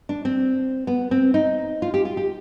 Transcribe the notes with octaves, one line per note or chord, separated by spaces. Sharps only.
D4
C4
B3
C4
D#4
F4
G4
F4
G4